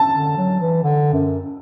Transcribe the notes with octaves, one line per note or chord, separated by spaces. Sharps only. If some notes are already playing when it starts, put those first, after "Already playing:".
Already playing: A5
D3
F#3
E3
D3
F#2